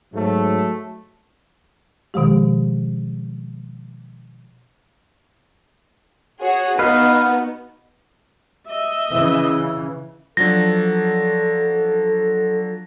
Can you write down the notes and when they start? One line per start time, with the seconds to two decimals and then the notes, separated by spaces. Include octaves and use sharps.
0.14 G#2 F#3 A3
2.14 B2 D#3 F3 G#3 G4
6.42 F#4 G#4 C#5
6.79 B3 D#4 F#4 B4 D#5 F5
8.67 D#5 E5
9.10 C#3 E3
10.37 F3 F#3 D4 A4 A#6